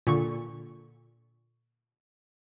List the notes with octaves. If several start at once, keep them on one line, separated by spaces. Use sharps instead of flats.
A#2 D3 C#6